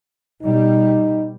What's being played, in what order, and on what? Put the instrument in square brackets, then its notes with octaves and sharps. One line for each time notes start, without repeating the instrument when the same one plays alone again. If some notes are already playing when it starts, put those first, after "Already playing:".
[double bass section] B2 G3 [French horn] D#4